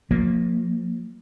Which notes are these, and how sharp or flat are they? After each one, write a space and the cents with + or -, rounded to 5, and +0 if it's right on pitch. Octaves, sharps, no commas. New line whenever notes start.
F3 +30 A#3 -10